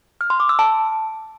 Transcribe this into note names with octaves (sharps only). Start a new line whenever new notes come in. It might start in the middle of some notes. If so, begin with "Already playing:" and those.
F6
C6
D6
E6
A5